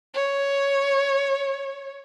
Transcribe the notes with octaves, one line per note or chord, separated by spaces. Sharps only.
C#5